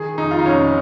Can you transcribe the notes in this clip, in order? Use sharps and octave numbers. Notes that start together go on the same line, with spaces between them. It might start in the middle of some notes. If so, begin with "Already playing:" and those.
Already playing: D#3 G#4
F1 D#4
F4
D#4
F1 C#4